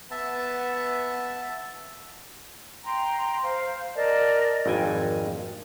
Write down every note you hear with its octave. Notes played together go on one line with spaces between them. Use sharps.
B3 E5 A5
G5 A#5 C6
C5 F5
A#4 D5 D#5 A5
G#1 F2 G5 G#5